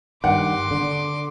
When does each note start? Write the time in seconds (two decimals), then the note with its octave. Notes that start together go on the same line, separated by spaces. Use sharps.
0.24 G2 D#3 F#5 C6 D6
0.71 D3